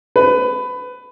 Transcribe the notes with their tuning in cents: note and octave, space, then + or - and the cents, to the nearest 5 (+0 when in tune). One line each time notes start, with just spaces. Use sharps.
B4 +20